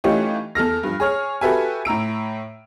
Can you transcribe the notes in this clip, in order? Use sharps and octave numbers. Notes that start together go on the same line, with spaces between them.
E3 A3 C#4 D#4 F4 G4
E2 A4 F6 A#6
G2 F3
G#4 C#5 F6
F#4 G4 A4 B4 E5 G#5
A2 A#5 E6 D7